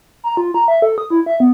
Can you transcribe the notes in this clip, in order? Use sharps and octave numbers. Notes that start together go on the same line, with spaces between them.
A#5
F4
A#5
E5
A4
D#6
E4
E5
B3